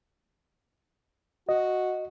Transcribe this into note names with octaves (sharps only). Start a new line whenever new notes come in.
F#4 D#5